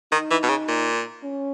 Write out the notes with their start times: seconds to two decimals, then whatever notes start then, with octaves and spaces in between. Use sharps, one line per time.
0.12 D#3 D#4
0.31 E3
0.43 B2
0.49 C#3
0.68 A#2
1.24 C#4